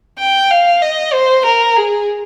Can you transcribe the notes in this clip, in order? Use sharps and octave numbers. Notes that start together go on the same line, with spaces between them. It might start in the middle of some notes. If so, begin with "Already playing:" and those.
G5
F5
D#5
C5
A#4
G#4